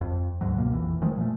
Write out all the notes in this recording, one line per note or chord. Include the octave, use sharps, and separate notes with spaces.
F2
D2 G#2 F#3
C#2 B2 A#3
A#1 F2 E3
D#3 F3 G#3 A3
A#2 A3